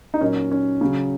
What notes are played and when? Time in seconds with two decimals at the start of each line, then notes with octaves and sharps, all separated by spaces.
0.14 D#4
0.21 A#2 F#3 C#4
0.51 C#4
0.81 C#3 F#3